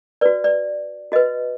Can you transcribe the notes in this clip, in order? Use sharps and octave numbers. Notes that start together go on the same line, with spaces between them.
F#4 B4 D5
D5
F#4 B4 D#5